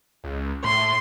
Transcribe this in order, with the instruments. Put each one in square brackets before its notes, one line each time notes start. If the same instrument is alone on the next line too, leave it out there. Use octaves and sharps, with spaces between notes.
[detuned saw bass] C#2
[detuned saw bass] A2 [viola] C6